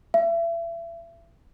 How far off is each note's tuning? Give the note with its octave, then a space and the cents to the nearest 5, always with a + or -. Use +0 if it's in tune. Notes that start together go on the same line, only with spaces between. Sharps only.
E5 +35